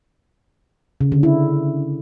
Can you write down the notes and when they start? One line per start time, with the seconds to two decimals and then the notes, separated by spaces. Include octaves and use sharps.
1.01 C#3
1.12 D3
1.23 E4